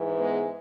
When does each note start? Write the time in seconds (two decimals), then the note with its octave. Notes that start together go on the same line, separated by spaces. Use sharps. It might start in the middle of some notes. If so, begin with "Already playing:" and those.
Already playing: G#2 E3
0.17 G#3 B3